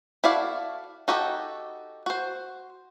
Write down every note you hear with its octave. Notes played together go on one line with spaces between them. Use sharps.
E4 F#4 A4 D5 F5
D#4 F#4 G4 A4
F#4 C5